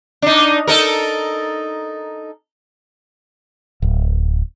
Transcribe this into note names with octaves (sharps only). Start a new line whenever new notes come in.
D4 D#4
D#4 A4 A#4
D1